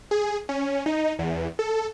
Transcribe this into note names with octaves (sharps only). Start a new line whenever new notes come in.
G#4
C#4
D#4
E2
A4